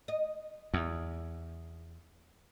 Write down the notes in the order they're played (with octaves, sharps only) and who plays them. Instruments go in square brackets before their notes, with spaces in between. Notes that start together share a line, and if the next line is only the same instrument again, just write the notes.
[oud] D#5
[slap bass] E2